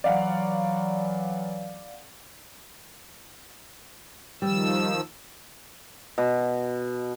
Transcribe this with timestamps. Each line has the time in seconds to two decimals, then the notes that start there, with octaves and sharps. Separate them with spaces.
0.04 E3 F#3 D5 F5 F#5
4.42 D#3 F3 G3 E6
6.18 B2